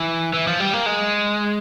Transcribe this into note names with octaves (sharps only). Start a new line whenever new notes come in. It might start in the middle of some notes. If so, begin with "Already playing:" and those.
Already playing: E3
E3
F3
G3
A#3
G#3